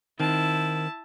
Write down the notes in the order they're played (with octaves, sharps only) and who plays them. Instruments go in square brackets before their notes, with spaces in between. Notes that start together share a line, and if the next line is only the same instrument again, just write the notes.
[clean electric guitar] D#3 C4 [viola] E4 A5